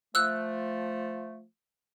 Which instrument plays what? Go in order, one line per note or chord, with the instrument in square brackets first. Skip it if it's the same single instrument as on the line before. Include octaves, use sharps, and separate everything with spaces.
[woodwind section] F3 A3 [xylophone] E6 F#6